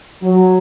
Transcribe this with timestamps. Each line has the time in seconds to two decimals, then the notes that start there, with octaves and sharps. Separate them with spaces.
0.23 F#3